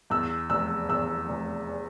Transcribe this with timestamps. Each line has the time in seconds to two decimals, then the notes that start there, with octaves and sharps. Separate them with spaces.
0.10 E2 E6
0.50 F1 E6
0.89 E2 E6
1.29 F1